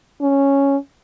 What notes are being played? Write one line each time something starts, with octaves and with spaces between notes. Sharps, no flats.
C#4